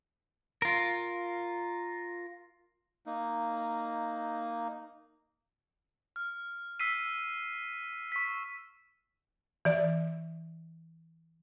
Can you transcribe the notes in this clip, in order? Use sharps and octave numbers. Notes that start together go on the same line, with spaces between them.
F4 A#4
A#3 D#4
F6
E6 B6 C7 D#7
C#6 B6
E3 D5